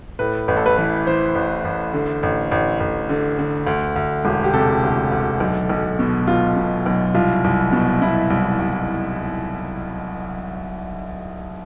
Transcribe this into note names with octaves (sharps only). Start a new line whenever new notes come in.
A2 B4
A1 B4
A4
B4
E3 B4
E3 C5
A1
A1
D3
A1
A1
A1
D3
D3
D2
D2
E1
G4
C3 A4
D2
D2
B1
B1
B2
B2 F4
B2
B1
C2 F4
C2
B2
B2 E4
C2
C2